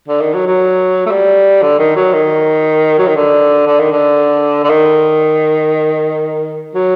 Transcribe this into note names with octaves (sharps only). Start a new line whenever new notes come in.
D3
D#3
F#3
F#3
A3
G3
D3
D#3
F#3
D#3
F#3
D#3
D3
D3
D#3
D3
D3
D#3
F#3